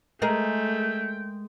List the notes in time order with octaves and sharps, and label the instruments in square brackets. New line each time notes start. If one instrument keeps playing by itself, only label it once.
[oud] G#3 G#4 A#4 [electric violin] A3 [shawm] G5